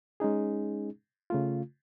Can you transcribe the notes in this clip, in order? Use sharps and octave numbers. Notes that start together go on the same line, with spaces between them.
G#3 C#4 D#4 G#4
C#3 A3 F4